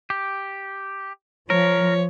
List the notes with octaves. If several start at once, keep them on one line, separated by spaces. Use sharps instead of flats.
G4
F3 A#4 C#5